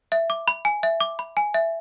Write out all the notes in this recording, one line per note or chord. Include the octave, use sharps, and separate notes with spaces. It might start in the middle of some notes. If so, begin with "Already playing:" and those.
E5
D6
B5
G#5
E5
D6
B5
G#5
E5